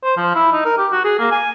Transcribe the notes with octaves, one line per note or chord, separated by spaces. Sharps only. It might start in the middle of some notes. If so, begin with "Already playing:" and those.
C5
F3
E4
D#4
A#4
G4
F#4
G#4
A#3
G#5